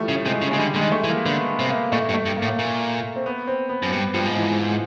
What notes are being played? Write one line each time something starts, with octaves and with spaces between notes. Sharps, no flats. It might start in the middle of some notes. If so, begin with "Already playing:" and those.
Already playing: E3 F3 G3 A3
C#3
C3 G#3
C#3
G#3
C#3
D3 G3
D3 G#3
D#3
A3
E3
A#3
D3 B3
B3
C3
A#3
A#2 A3
G2
A3
G2
A#3
A2
A#2
C4
B3
C4
B3
F#2
G2 B3
G2 F3
G#2
E3